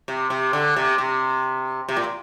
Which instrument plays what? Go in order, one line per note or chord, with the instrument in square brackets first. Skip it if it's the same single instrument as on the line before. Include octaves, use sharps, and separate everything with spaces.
[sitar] C3
C3
D3
C3
C3
C3
A#2